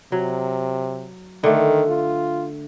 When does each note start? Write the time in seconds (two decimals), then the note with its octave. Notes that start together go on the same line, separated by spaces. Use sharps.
0.12 C3 F#3
1.44 D3 D#3 A3
1.89 F4